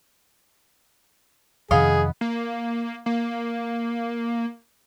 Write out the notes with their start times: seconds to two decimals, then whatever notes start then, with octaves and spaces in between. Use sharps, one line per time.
1.71 F2 C3 D#3 B3 G#4 D#5 F5
2.21 A#3
3.06 A#3